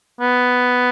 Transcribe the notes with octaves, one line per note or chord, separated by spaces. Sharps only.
B3